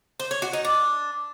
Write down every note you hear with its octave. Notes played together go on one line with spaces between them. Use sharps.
C5
C#5
F#4
D#4
D4